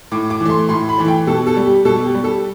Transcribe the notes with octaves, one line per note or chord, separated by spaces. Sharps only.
A2 D6
D6
E3
A3 C6
A2 C6
B5
E3 A3
G5
B2 A4
A4
G3
G4
B2 A4
G4
G3
A4